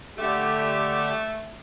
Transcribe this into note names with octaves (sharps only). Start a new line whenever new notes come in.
D3 A3 G4